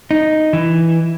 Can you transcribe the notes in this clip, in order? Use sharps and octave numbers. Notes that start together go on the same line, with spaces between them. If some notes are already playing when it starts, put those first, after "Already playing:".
D#4
E3